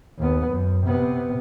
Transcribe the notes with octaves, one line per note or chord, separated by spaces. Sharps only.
D#2 B3
F#2
C3 B3